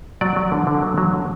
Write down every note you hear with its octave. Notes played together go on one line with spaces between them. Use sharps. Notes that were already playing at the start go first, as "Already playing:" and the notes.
F#3 D5
F#3
D3
D3
F#3
F#3
D3